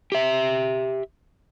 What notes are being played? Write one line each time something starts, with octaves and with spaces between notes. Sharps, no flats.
G4 E5